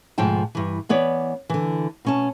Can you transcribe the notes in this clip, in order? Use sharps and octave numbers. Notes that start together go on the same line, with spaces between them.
D2 G#2 B2 F3 G5 A5
G2 E3
E3 B3 C#5 D5
D3 E3
B2 C#4 A5